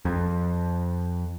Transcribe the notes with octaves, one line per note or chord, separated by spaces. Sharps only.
F2